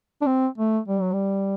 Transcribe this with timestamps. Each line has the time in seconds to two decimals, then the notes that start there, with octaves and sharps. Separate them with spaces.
0.21 D4
0.26 C4
0.58 A3
0.88 G3
1.01 F#3
1.12 G3